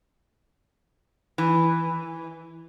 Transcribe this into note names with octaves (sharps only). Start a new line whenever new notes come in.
E3